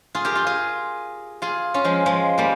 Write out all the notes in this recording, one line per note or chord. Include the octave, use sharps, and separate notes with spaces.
F4 G#4
G4 A#4
F4 G#4
F4 G#4
F4 G#4
C#4 F4
F3 G#3
F3 G#3
G3 A#3